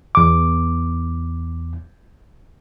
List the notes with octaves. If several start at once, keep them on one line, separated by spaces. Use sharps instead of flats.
E2 D6